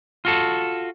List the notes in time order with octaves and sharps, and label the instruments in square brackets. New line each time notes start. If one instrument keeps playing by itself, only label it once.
[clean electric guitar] F4 F#4 A4